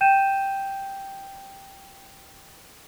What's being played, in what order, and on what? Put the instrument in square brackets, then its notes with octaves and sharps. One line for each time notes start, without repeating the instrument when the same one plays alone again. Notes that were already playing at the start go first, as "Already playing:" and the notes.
[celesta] G5 G6 D#7 E7